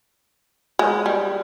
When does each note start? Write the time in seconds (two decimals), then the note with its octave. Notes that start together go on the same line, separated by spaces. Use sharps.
0.79 G#3
1.06 G3